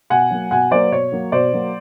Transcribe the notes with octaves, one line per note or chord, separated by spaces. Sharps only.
B2 F#5 G#5
F#3 A#3
B2 F#5 G#5
F#3 A#3 C5 D5
B2 C#5
F#3 A#3
B2 C5 D5
F#3 A#3